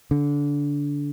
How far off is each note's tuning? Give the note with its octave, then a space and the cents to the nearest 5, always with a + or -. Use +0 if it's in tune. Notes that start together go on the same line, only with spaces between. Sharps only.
D3 -20